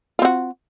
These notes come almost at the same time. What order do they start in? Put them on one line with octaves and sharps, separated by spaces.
F4 C4 F#4